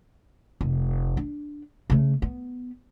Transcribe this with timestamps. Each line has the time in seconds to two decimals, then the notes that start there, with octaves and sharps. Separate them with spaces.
0.61 F1
1.17 D4
1.90 C#3 A3
2.22 B3